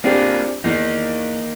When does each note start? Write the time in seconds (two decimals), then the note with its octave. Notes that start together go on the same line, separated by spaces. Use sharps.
0.04 A#3 C4 D4 F4 G4 G#4
0.64 E2 A#3 D#4